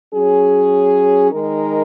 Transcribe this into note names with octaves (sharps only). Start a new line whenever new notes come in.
F#3 C#4 G#4
D#3 G#3 D#4 A#4